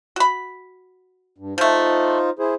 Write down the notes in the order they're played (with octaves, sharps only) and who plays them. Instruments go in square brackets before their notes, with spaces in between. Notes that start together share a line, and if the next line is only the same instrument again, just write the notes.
[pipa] F#4 B5
[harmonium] G2
[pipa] F3 A3 [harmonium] D#4 F4 C5
[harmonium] E4 G#4 C5